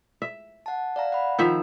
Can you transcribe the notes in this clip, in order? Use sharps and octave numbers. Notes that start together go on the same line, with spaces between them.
E5
F#5 A5
D5 F5 A#5
F#5 B5
D#3 F3 D#4 E5 E6